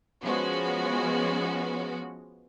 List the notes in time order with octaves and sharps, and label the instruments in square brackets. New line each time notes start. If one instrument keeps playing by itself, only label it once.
[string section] F3 G#3 B3 C#4 F#4